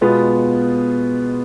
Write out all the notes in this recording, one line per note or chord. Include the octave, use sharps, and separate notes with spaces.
B2 G#3 B3 F4